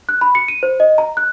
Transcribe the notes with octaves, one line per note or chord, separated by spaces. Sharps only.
F#6
B5
C#7
D#7
C5
D#5
A#5
F#6